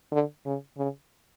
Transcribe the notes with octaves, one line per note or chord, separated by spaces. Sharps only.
D3
C#3
C#3